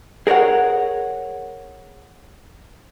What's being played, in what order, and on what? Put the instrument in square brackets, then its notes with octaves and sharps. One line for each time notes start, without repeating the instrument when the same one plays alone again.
[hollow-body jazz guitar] G#4 A#4 C5 C#5 F#5